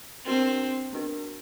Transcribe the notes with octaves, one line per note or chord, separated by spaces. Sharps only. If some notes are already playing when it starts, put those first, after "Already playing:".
B3 C4 D4 F#4 A#4
B3 D4 F#4 A#4